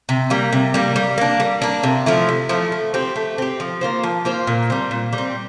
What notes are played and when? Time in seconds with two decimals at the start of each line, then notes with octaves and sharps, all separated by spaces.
0.09 C3
0.30 G3 A#3
0.53 C3
0.74 G3 A#3
0.96 G3
1.18 A#3 D4
1.40 G3
1.62 A#3 D4
1.83 C3
2.06 F3 A3 E4
2.29 C3
2.49 F3 A3 E4
2.72 A3
2.94 C4 G4
3.16 A3
3.38 C4 G4
3.60 F3
3.81 A#3 F4 C5
4.04 F3
4.25 A#3 F4 C5
4.47 A#2
4.70 G3 C4
4.91 A#2
5.13 G3
5.18 C4